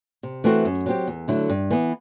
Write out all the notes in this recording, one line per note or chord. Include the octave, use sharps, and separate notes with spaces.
C3
E3 A3 C4 F#4
F#2
F#3 C4 G4
E2
D3 F#3 A3 E4
G2
E3 B3